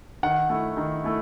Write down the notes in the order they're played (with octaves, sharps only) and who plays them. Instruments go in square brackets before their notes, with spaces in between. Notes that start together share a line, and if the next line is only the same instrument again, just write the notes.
[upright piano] D#3 [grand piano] F#5
[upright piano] A3 E4
D#3
A3 E4